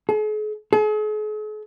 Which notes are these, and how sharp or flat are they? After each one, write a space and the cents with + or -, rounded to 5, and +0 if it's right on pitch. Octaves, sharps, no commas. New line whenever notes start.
G#4 +45
G#4 +45